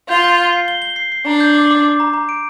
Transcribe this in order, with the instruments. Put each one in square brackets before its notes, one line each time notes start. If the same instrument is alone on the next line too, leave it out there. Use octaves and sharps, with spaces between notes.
[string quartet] F4 [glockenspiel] G6
[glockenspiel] G6
G7
C7
G7
G7
C7
C7
[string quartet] D4 [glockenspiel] A#5
[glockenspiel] G6
D6
D6
D6
A#5
A#5
D7